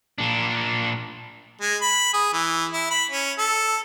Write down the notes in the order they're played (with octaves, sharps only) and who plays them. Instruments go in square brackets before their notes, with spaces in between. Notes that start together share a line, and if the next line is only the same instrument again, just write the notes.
[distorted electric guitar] A#2 D4
[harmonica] G#3
B5
G#4
E3
E4
B5
C#4
A4